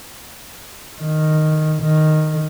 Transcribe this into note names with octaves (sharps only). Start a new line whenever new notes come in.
D#3
D#3